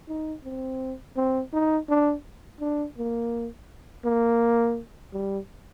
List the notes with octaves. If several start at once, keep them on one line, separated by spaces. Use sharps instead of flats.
D#4
C4
C4
D#4
D4
D4
A#3
A#3
G3